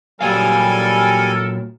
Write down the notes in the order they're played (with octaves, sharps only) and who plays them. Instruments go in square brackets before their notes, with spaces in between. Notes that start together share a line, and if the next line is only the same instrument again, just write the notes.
[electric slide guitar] A#2 F#3 F5 [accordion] G3 G#5 [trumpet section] A4 [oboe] A#4